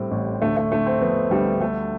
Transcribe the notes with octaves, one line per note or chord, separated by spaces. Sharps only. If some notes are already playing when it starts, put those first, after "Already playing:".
Already playing: A2 G3 C4
A1
D2 A3
A3
D3 A3
C4
F3 B3
D2 G3
G3 A3